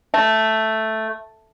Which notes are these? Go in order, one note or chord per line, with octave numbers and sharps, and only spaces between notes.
A3